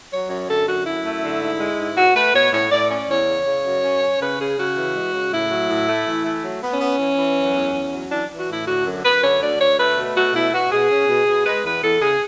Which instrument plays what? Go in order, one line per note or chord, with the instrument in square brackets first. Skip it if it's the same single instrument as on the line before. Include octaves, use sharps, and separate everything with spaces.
[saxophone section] F#3 C#5
F#2 C#5
D3 A4
F#2 F#4
F#2 E4
A3
D3
G#2
G#3
G#2
B2 F#4
A3 B4
B2 C#5
A2 C#5
A2 D5
C#4 D5
E2 C#5
C#3
C#3
F#2
C#4
C#4
C#3 B4
C#3 G#4
C#3 F#4
E3
G#3
C#3
A2 E4
F#3
A2
A3
E3
A3
F#3
B3
C#4
B3
E3
E3
F#2
E2
E2
F#3
E3 D4
E3
F#4
A2 E4
D3 F#4
F#2
F#2 B4
D3 C#5
D2 D5
D2 C#5
A3 B4
B2
A3 F#4
B2 E4
B2 F#4
B2 G#4
C#4
B2
B2
G#3 B4
E2 B4
E2 A4
C#3 G#4